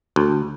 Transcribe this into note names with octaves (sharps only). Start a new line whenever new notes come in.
D2